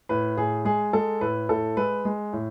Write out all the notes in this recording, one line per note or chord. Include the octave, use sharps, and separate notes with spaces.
A2 B4
A2 G#4
G#3 G#4
G#3 A4
A2 B4
A2 A4
G#3 B4
G#3
A2